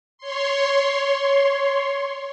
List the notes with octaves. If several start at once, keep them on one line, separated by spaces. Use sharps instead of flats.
C#5 C6